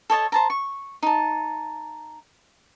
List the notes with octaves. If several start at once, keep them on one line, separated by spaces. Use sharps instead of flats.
A4 C#5 D#5 A5
C5 A5 A#5
C#6
D#4 A5